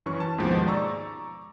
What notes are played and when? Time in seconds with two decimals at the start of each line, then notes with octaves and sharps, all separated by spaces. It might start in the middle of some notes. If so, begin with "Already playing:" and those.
0.06 F#2 E3 C#4 C#6
0.20 A5
0.38 D#2 G#2 B2 F3 G#3
0.67 D5 A#5 C#6 E6